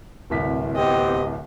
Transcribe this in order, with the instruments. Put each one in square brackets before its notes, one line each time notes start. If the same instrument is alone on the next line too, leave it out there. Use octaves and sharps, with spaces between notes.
[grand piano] D1 C2 B6
[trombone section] B3 C4 G4 [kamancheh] D#5